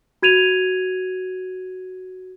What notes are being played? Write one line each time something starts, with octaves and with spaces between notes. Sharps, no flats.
F#4 G#6 D#7 F7